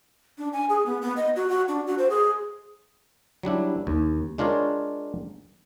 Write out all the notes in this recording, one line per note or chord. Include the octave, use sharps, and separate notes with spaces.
D4
G#5
G#4
B3
B3
D#5
F#4
F#4
D4
F#4
C5
G#4
F#3 G3 D4 E4
D#2
G#3 D4 F4 A#4 C#5